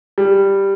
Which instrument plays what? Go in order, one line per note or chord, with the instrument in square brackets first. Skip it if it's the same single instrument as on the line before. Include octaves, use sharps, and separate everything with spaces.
[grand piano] G3